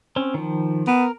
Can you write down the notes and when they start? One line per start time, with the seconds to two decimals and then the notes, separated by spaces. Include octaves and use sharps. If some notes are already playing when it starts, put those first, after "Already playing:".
0.16 C4 C#4
0.34 D#3 F3
0.87 B3 A#4